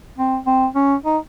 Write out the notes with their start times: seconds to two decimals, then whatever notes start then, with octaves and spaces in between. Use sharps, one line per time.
0.18 C4
0.47 C4
0.75 C#4
1.04 D#4